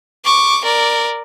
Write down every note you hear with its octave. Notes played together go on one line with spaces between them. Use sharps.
C#6 D6
A#4 D5